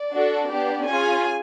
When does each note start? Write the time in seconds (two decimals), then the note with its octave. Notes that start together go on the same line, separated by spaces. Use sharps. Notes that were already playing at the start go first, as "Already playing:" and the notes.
Already playing: D5
0.13 D4 F#4 A4
0.50 B3 D4 G4
0.87 C#4 F4 G#4 G#5